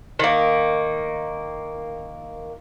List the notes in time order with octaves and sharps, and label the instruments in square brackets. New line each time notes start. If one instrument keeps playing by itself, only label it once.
[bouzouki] D#3 A#3